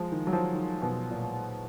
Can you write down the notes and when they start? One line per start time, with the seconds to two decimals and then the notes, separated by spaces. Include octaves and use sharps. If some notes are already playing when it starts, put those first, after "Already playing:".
Already playing: F3 G#3
0.12 D#3
0.27 F#3
0.33 F3
0.54 D#3
0.82 B2
1.11 A#2